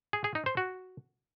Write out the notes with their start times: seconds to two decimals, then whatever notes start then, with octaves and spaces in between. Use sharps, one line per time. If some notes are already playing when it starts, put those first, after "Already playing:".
0.13 G#4
0.24 G#4
0.35 D#4
0.46 C5
0.57 F#4